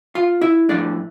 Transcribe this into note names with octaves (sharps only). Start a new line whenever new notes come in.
F4 F5
E4 E5
A2 F3 A3 D4 D5